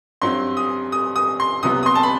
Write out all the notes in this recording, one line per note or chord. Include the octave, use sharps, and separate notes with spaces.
G2 F#3 C4 C6
D#6
D#6
D#6
C6
C2 C3 F#3 B3 D#6
D#6
C6
A5
B5